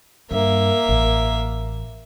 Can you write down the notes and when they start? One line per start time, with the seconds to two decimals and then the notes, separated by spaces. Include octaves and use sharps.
0.31 G2 A#3 E5
0.89 A1